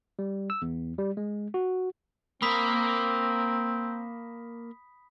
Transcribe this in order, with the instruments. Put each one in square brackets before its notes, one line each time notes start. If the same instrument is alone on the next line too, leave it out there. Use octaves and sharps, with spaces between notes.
[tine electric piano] G3
E6
E2
G3
G#3
F#4
[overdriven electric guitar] A#3 A#4 [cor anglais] C4 [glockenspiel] B5 D#6 B6